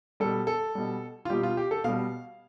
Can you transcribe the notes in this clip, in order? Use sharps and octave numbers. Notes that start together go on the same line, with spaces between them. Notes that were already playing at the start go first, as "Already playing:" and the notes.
B2 G3 A4
A4
B2 G3
F4
B2 G3 G4
F4
G4
A4
B2 G3 F5